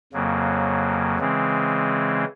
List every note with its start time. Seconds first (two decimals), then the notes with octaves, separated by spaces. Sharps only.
0.13 F2 C#3 F#3 A#3
1.19 C#3 E3 G#3 C4